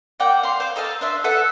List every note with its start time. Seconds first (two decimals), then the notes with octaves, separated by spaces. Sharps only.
0.20 A#3 D5 F#5 G5
0.43 F5 C6
0.60 C5 D6
0.76 D#4 A4 D#5 F5
1.01 D4 C5 E5
1.24 A4 B4 E5 F#5